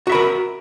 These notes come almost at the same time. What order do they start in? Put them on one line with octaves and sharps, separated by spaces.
F#4 E5 B5 A#4